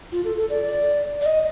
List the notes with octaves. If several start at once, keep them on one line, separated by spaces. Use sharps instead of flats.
F4
A4
A4
D5
D5
D#5